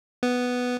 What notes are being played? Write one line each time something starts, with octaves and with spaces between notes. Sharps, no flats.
B3